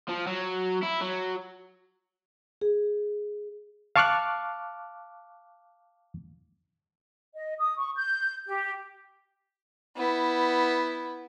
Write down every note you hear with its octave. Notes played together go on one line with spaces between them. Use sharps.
F3
F#3
E4
F#3
G#4
F5 A5 C#6 D6 F6 F#6
D#5
D#6
C#6
G6
G4
B3 E4